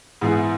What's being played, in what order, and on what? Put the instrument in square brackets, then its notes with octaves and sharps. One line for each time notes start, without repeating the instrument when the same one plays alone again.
[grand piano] G#2 E3 B3 E4 G#4